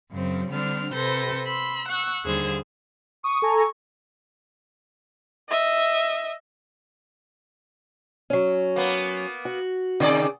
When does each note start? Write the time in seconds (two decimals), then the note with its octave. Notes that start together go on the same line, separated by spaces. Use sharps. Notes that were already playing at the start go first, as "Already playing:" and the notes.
0.11 F#2 C#3 F#3 C4
0.51 D3 G3 C4 D4 F6
0.93 C3 A4 B4 C5 G6 A#6
1.45 B5 C6 E6
1.88 F#5 C#6 E6
2.24 D#2 D3 G3 G#4 C5 G#6
3.24 C#6 D#6
3.42 A4 G#5 A#5
5.49 D#5 E5
8.30 F#3 C#4
8.76 A#3 B3
9.45 F#4
10.00 C3 D#3 G#4 D5